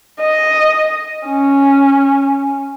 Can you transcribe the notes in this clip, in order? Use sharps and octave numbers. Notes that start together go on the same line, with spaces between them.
D#5
C#4